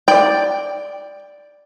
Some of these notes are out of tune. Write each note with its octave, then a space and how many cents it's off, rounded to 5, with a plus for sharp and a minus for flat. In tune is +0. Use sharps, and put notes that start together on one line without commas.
D5 +0 G5 +15